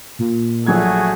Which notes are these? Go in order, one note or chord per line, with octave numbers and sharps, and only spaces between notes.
A#2
A#1 F#3 A3 F#4 G#4 G#6